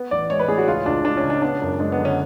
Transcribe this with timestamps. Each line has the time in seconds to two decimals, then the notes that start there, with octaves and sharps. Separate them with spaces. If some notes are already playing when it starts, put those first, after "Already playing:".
Already playing: B3
0.11 A1 D5
0.30 G#3 C#5
0.39 B4
0.48 A2 G#4
0.58 F#4
0.68 C#2 F4
0.86 C#2 D4
1.05 G#3 D4
1.17 C#4
1.24 C#3
1.30 D4
1.42 B3 D4
1.62 F#2
1.79 G#3 D4
1.92 B3
1.99 D3
2.05 C#4